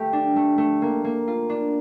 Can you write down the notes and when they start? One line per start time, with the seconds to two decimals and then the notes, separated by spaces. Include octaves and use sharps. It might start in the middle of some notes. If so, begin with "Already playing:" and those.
Already playing: A3 G4
0.13 D4
0.36 A3
0.58 A3
0.82 A#3
1.04 A#3
1.28 F4
1.49 D4